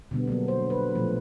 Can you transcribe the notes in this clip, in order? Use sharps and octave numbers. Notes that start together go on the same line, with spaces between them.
B2 D3 G3 B3
F#3 A#3 B3 D4
C5
B4
A#2 F3 A3